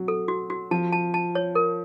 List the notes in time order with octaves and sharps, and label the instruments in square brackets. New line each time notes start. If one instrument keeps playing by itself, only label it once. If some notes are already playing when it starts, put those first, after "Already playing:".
Already playing: [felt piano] F#3
[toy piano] A4
F#4
F#4
[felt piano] F3 [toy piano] A5
[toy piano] A5
A5
C#5
A#4